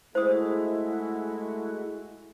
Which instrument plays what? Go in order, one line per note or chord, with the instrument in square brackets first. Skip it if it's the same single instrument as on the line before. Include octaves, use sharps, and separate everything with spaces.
[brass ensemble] G#3 A3 F#4 [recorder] E4 [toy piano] C5 D#6